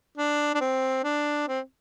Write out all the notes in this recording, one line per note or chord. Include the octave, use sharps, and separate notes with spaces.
D4
D4
C4
D4
C4